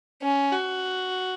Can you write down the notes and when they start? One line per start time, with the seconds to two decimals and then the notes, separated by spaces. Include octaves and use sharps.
0.23 C#4
0.52 F#4